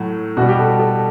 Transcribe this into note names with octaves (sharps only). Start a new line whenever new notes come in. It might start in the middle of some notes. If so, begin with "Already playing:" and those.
Already playing: A2 F#3 A3
B2 G3 F#4
G4
A4
A4